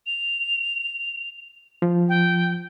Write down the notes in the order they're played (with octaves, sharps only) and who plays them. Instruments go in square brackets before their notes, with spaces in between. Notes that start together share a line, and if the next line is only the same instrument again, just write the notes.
[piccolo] F7
[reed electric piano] F3
[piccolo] G5